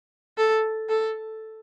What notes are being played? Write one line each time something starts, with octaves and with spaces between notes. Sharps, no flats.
A4
A4